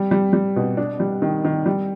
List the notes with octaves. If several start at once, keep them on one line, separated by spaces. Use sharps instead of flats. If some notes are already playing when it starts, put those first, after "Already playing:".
Already playing: G3
G3
G3
B2
D4
G3
D#3
D#3
G3